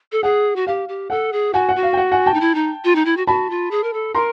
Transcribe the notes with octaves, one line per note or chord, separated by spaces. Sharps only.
A4
G#4 F#5
F#4
G4 F5
G4
A4 F#5
G#4
F#4 F#5 G#5
F#5
F#4
F5
G5
F#5
F#5 G#5
G5 A5
D#4
E4
D#4
F4
D#4
E4
F#4
F#4 A5 B5
F4
G#4
A#4
A4
A#4 A#5 C6